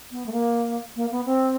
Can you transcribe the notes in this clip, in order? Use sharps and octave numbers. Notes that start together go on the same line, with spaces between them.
B3
A3
A#3
A#3
B3
C4